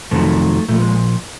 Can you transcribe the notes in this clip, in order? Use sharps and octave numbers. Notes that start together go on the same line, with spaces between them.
F2 C3 D#3 F#3 A3
A#2 F3 A3
G#3